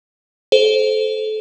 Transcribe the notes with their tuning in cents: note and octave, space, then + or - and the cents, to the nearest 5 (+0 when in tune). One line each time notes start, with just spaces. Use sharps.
A4 -30 C5 +0